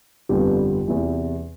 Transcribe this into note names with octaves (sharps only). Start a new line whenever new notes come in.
G1 F2 D3 G3 B3 F4 G4
E2 C3 E3